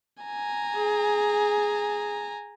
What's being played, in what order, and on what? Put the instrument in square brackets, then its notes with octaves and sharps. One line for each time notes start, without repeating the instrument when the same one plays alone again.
[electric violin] G#5 A#5
[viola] G#4